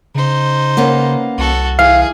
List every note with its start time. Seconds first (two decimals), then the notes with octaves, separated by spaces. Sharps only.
0.15 C#3 D#4 C5
0.77 A#3 B3 C#4
1.38 C2 F#4 A4
1.79 E3 G#4 F5